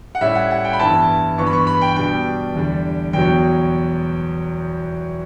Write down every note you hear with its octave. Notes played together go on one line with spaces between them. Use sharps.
F#5
A2 G3 C#4 E4 E5
F#5
F#5
G5
B5
G2 E3 B3 E4 A5
G2 E3 B3 C#6
B5
C#6
B5
G5
B2 G3 D4 G5
E2 D3 G3
E2 B2 F#3 G5